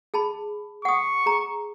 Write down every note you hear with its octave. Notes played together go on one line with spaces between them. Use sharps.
G#4 A5 B5
F#5 C#6 D#6
G#4 A#5